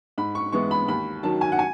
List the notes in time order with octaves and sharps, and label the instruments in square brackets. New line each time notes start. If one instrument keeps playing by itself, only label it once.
[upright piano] G#2 B5
C#6
E3 G#3 B3 E4 C#6
B5
D#2 B5
D#3 F#3 A5
G#5
F#5
G#5